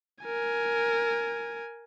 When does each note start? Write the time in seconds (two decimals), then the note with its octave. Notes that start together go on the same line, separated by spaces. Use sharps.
0.25 A#4 G#5